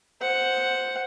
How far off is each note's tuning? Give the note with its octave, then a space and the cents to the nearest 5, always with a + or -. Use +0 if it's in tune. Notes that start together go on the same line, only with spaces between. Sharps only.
C5 +0 F#5 +0